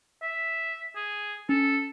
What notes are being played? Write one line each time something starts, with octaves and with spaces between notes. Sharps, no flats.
E5
G#4
C#4 A4